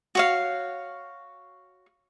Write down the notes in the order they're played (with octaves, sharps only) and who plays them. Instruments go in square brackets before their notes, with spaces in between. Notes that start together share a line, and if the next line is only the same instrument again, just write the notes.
[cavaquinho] F#4 C#5 F5